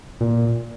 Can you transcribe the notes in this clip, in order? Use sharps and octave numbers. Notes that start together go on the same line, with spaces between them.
A#2